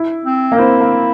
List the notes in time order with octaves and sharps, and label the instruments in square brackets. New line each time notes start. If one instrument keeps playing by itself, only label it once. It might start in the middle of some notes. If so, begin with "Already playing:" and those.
Already playing: [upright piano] E4
[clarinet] C4
[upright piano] A#3
[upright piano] C4 [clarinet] E4
[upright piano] A#3